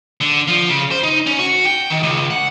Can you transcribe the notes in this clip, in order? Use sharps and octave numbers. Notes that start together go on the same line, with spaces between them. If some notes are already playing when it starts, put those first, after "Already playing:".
D3
F3
C#3
C5
D#4
C#4
F#4
G5
D#3
C#2
F#5